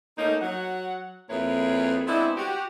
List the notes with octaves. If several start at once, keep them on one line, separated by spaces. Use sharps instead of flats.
A3 A#3 C#4 D#4
F#3 F#5
F2 A#3 E4 G#4 B4 C#5
G#3 B3 C4 D4 E4
F#4 G4